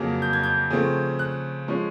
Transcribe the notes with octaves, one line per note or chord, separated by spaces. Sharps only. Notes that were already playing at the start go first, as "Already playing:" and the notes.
Already playing: F2 C#3 F#3 A#3
G6
G#6
G6
C#3 F3 A3 C4
F#6
F3 G#3 C#4